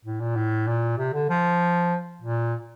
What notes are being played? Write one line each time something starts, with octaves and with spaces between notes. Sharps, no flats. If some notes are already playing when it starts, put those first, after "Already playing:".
A2
A#2
A2
A#2
C3
D3
F3
A#2